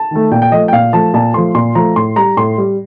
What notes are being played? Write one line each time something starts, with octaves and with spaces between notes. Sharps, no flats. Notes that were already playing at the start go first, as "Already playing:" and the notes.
Already playing: A5
D#3 A3
A#2 G5
G5
F3 A3 D#5
G5
A#2 F5
F3 A3 A5
A#2 A5
F3 A3 C6
A#2 C6
F3 A3 A#5
A2 C6
G3 A#5
A2 C6
G3